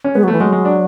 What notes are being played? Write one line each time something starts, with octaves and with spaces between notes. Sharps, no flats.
C#4
G#3 B3
F#3
E3 A3
F#3 G#3
G#3
D4